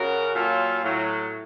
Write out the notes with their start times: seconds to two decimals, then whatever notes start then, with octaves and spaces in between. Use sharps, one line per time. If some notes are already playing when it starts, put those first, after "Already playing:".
Already playing: F#2 C#3 F#3 F#4 A#4
0.34 A#2 F#3 F4 A4
0.83 A2 F#3